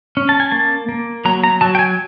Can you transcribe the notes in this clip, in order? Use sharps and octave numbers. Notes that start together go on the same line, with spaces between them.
C#4
A5
G#5
A#3 A5
A#3
F#3 A#5
A#5
F#3 A5
G5
G#5